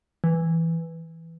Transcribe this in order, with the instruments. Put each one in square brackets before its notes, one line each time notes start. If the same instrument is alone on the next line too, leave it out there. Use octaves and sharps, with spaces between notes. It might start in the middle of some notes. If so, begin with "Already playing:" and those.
[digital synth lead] E3